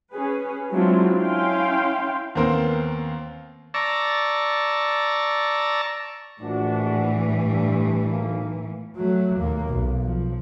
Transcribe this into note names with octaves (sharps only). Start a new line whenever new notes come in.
C#4 G#4 B4
F#3 G#3 C4 D4 E4 F4
C#4 E4 F5 G5 C6
D#2 B3 C4 A#4 C6
D5 A5 A#5 C#6 E6
A#1 A2 E3 D4 F#4
G2
B1 A#3
F#3 A3
D#2 A#3
B1
F3